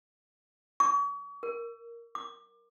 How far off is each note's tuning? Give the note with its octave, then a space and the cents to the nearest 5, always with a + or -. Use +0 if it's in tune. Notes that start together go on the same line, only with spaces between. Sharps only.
C#6 +40
A#4 -5
D6 +25